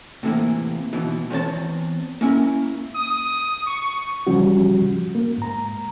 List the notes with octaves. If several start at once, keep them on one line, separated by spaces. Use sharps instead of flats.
A2 C3 E3 G3 A#3
D#2 B2 E3
E2 C4 C#5 A5
A#3 C#4 E4 A#4
D#6
C#6
C#3 E3 F3 G3 C#4 F#4
A#3
G#2 A#5